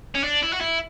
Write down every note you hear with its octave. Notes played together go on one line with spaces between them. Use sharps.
C#4
D4
E4
F#4
E4